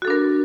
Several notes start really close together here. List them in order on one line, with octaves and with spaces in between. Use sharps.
F#4 A4 D4 A#4